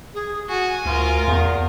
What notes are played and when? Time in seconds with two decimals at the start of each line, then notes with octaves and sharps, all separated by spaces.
0.14 G#4
0.49 F#4 G#5
0.85 D2 F4 A#4
1.28 E2